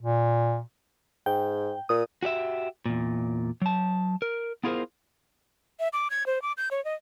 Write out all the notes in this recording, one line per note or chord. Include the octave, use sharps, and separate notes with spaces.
A#2
G#2 G5
A#2 D#6
F#4 G4 D5 E5
E2 A#2
F#3 A5
A#4
B3 E4 F4 G#4 A#4 C5
E5
D6
G#6
C5
D6
G6
C#5
D#5